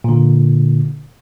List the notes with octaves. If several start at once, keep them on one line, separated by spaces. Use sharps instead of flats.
A#2 D3